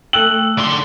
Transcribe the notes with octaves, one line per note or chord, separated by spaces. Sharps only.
A3 G5 E6 F#6 F#7
D3 C6